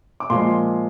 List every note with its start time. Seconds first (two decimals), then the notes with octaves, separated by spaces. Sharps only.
0.20 D6
0.30 A#2 F3 G#3 C6